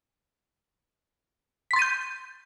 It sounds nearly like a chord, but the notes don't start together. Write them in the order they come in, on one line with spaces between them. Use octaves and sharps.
B6 C6 A6 D#7 G6